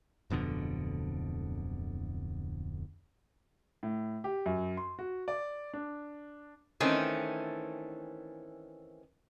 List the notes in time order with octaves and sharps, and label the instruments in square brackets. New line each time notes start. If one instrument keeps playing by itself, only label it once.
[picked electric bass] D1 F2 B2 D3
[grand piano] A2
G4
F#2
C6
F#4
D5
D4
[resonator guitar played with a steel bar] D#3 E3 A3 C4 C#4